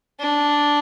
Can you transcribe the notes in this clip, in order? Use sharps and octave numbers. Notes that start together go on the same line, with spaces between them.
D4